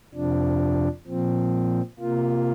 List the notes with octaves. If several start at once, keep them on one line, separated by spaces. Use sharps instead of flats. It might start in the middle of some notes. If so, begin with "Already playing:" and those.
F2 C3 F3 D4
A#2 F3 C4
C3 A#3 F4